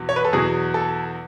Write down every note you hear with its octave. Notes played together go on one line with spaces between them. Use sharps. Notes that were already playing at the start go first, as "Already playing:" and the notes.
Already playing: E2 B2 F#3
C#5
B4
A4
E2 B2 F#3 G#4
A4